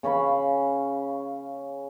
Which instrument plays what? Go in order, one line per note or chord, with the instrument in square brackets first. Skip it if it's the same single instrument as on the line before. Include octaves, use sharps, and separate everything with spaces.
[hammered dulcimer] C#3 C#4 F5 B5